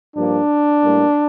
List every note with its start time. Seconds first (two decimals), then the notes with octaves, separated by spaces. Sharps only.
0.16 G2 F3 A#3 D4
0.82 A2 G3 A#3